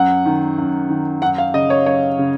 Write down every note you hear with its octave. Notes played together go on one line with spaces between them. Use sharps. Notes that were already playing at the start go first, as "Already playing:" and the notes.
Already playing: F#2 F#5
D#3
F#2
D#3
F#2 F#5
F5
C#3 D#5
C#5
F#2 C#5
C#3